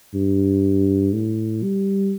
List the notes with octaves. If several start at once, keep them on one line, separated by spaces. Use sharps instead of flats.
G2
A2
G3